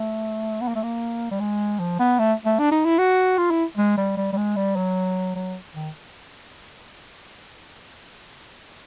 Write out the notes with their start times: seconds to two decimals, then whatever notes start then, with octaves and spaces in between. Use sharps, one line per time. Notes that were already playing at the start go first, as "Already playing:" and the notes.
Already playing: A3
0.61 B3
0.68 A#3
0.76 A3
0.83 A#3
1.31 G3
1.40 G#3
1.80 F3
1.99 B3
2.19 A3
2.46 A3
2.59 D4
2.72 D#4
2.85 E4
2.99 F#4
3.38 F4
3.51 E4
3.77 G#3
3.98 G3
4.17 G3
4.33 G3
4.37 G#3
4.56 G3
4.76 F#3
5.35 F#3
5.75 D#3